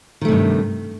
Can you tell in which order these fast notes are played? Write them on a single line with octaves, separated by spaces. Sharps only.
D#3 A3 C3 G2